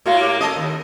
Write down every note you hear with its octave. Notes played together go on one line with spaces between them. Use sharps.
A2 A#3 F#4 C#5 F5
G4 A#4 C#5
C#4 A4 A#4 D#5
D#2